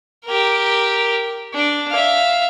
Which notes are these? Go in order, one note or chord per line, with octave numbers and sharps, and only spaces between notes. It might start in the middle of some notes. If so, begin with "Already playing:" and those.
G4 A#4
D4
E5 F5